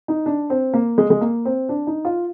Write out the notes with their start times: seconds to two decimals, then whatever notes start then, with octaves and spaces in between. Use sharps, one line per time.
0.08 D#4
0.26 D4
0.50 C4
0.74 A#3
0.98 G#3
1.10 G#3
1.21 A#3
1.45 C4
1.69 D4
1.87 D#4
2.05 F4